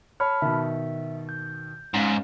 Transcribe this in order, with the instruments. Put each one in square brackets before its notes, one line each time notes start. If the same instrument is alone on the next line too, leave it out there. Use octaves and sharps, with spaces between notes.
[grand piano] C#5 [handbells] A5 B5 F6
[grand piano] B2 D#3 [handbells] E5
[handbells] G6
[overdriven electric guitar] G#2 [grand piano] C#4 F5